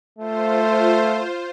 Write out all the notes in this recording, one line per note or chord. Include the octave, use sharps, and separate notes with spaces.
A3 F4 C5